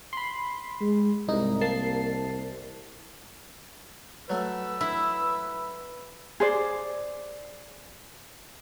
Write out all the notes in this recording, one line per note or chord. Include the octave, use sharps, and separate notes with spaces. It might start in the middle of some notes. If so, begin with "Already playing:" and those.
B5 C6
G#3
C2 G#2 D#4
A#3 A5 C7
F#3 A3 B4 E6
E4
G#4 C5 D5